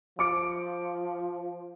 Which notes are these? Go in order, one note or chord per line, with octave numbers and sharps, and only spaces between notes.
F3 D6 C#7 D7